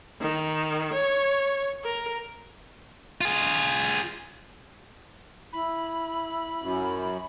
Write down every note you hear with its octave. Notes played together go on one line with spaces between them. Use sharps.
D#3
C#5
A#4
F4 G#4
E4 B5
F#2